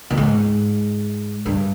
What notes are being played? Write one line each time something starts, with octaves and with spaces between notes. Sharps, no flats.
A#2
G#2
G2